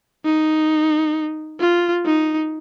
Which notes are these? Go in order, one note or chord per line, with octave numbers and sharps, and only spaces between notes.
D#4
F4
D#4